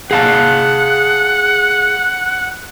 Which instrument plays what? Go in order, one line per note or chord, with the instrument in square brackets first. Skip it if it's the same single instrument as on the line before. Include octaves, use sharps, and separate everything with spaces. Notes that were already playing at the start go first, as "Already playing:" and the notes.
[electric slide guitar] G#4 F5 A5 [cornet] F#5